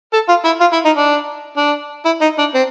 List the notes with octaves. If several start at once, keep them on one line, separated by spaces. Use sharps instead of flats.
A4
F4
E4
F4
E4
D#4
D4
D4
E4
D#4
D4
C4